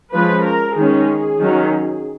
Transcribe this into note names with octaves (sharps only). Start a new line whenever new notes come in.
F3 G#3 C#4 B4
A#4
D#3 G#3 C#4 G#4
D#3 F#3 C#4